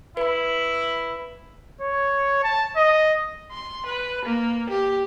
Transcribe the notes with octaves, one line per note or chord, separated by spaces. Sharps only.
E4 B4 B5
C#5
A5
D#5
C6
B4
A#3
G4